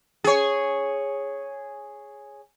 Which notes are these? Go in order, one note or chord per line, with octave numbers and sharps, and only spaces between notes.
G#4 C#5